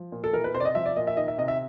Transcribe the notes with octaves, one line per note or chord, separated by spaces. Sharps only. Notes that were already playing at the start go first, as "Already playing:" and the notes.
Already playing: F3
A#2
A4
E3 A#4
B4
C3 C5
D5
D#5
F3 E5
D5
A#2 D#5
E5
D#3 D#5
E5
C3 D#5
E5